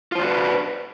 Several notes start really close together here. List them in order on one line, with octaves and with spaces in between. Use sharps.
F4 C5 D4 F#4 B4